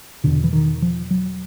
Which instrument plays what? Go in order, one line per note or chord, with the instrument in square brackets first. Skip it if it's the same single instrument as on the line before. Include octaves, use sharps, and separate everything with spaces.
[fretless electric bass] E2 B2 D3
E3
D#3
F3
F#3